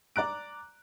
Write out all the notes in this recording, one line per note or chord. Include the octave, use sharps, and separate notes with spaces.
D5 A#5 F#6 D7